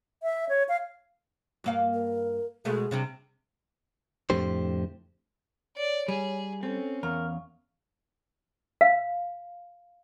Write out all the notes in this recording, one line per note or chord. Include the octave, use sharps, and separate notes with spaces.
E5
C#5
F5
G2 A#3 F5
A#4
B2 G#3 A3 G#4
C3 G3 D4
F2 A2 D3 G4 C5
C#5 D5
G3 G#4
C4 C#4 A4
E2 B3 A#4 F5 C#6
F5